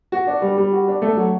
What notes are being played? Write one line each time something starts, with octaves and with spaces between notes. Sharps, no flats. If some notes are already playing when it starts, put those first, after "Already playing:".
F#4
D4
G3
G3
F#4
D4
A3
F#3